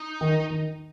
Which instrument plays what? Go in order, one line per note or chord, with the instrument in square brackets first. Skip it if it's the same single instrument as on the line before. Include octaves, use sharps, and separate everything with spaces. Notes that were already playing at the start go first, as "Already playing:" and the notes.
Already playing: [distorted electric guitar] D#4
[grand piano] D#3
D#3